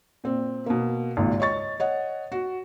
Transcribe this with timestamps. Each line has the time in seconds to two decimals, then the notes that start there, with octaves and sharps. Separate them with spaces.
0.24 A#2 C4
0.66 B2 A#3
1.17 G#1 C#2 A#2
1.40 C#5 D#5 C#6 A6
1.80 C#5 D#5 F#5
2.32 F#4